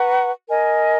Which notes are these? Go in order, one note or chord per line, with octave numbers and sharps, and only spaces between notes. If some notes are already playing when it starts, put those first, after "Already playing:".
Already playing: B4 F#5 A#5 C#6
A#4 D#5 G#5